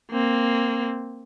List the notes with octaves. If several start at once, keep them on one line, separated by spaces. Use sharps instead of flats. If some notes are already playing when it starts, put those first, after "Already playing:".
A#3 C4